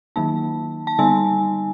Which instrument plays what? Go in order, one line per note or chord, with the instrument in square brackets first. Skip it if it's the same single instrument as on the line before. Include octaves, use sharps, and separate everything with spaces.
[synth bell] D#3 F#3 A#3 D#4 A5
A5
D3 G3 B3 D#4 G#5